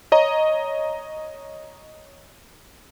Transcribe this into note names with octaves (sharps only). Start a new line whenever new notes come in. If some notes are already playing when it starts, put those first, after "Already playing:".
C#5 D#5 A#5